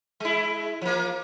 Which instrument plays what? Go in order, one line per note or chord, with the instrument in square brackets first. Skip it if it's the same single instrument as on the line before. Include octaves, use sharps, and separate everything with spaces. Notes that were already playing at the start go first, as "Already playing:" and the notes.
[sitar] G#3 E4
F3 A#3